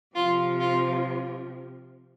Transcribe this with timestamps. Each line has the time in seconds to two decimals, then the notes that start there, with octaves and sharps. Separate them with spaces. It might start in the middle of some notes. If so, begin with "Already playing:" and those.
0.15 C3 F3 F4
0.60 F4